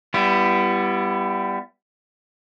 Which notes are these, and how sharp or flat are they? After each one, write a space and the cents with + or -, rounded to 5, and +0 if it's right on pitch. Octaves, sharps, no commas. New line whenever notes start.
G3 +0 B3 +0 E4 +35